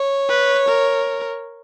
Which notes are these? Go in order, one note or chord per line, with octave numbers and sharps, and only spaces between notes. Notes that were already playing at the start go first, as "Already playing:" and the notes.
Already playing: C#5
B4
A#4